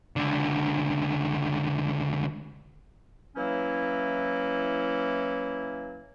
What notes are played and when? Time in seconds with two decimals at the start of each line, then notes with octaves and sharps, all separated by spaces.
0.16 C#2 D3
3.36 E3 F#3 A#3 C#4 E4